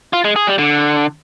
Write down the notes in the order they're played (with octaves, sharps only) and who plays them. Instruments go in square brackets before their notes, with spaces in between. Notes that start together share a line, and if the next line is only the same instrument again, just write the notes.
[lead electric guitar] F4
G#3
G#4
G3
D3